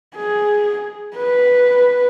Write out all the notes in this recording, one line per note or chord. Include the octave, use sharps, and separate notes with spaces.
G#4
B4